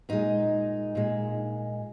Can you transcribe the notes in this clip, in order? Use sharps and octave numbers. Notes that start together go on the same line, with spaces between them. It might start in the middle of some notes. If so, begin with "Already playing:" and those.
A#2 G#3 D#4
A#2 G#3